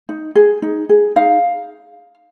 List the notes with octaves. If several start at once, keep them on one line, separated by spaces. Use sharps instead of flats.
D#4
G#4
D#4
G#4
D#4 F5